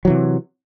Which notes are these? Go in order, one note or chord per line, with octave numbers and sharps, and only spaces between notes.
C3 E3 F#3